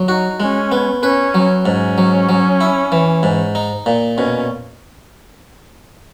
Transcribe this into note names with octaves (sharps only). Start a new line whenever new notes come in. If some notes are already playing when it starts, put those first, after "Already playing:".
Already playing: F#3
D#4 F#4
G#3 C#4
B3
C#4 B4
F#3
G#2 C#4
F#3
F#3
E4
E3
G#2
D#4
A#2
B2 C#4